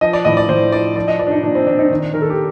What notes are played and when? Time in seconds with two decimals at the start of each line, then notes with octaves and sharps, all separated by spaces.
0.01 F3 D#5
0.13 D5
0.25 A2 D#5
0.37 D5
0.48 A2 C5
0.72 F3 D5
0.96 F3 D5
1.08 D#5
1.19 F3 D5
1.27 D4
1.31 D#4
1.43 A#2 D4
1.55 C4
1.67 A#2 D4
1.79 D#4
1.91 D#3
2.14 D#3 A#4
2.22 A4
2.30 G4